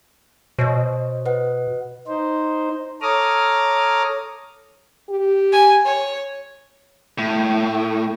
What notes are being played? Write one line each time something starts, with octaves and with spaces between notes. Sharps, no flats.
B2 C5 C#5 D#5
B4 D#5 F#5
D#4 C5
A4 C#5 A#5 D6 D#6 F6
G4
G#5
C#5
A2